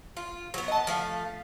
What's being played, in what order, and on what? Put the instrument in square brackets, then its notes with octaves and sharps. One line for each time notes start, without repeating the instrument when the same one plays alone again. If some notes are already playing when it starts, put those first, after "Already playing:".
[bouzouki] F4
F#3 B3
[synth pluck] D#5 A5
[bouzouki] F3 A3 F5